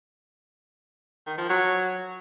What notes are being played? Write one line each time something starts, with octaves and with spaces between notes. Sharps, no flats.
D#3
F3
F#3